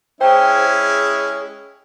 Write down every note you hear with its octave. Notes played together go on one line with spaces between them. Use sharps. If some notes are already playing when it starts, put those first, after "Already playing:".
G#3 C#4 E4 C5 G5 A5
G#4